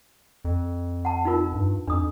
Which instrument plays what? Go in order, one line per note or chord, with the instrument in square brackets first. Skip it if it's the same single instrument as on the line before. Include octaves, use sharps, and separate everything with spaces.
[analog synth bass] F2
[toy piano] F#5 A5
D#4 F4 A#4
[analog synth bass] G2
[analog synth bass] F2 [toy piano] D4 D#6